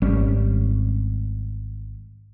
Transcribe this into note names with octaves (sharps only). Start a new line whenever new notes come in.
G#1 G3 C#4